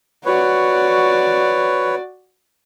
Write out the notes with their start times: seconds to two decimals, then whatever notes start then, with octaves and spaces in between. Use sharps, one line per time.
0.25 F#4 B4 C#5 D5